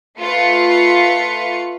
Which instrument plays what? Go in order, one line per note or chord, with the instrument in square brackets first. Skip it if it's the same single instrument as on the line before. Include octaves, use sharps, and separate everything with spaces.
[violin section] A3 F4 B4 C#7